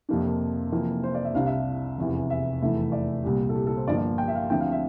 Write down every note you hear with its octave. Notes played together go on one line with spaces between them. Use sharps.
F2 C3 F3 A#3 D4 G4
A#4
F1 F2 E3 A#3
C5
D5
E5
C2 C3 G3 D4 F5
E5
F5
F1 E2 C3 E3
E5
F1 E2 E3 A3 E4
D5
C2 A#2 G3 G4
A4
G4
A4
C5
G1 G2 F3 A#3 D5
D5
G5
E5
F5
D2 D3 F3 C4 E4 G5
F5
E5